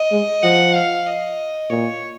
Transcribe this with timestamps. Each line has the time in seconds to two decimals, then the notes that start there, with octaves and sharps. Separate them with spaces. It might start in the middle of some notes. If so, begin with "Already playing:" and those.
Already playing: D#5
0.12 G#3
0.43 F3 F#5
0.75 F5
1.07 D#5
1.70 A#2 C#5